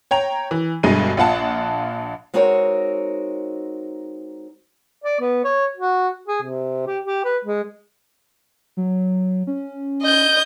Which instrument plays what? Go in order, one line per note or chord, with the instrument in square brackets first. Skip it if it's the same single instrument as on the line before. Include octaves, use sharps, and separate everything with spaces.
[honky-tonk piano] C#5 G5 A#5 F7
E3
G1 G2 B2 G#3 D#7
A#1 F4 F#5 A5
[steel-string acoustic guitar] G#3 C4 D#4 F#4 A#4 C#5
[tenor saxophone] D5
B3
C#5
F#4
G#4
C3
G4
G4
B4
G#3
[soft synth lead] F#3
C#4
[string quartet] D#5 G6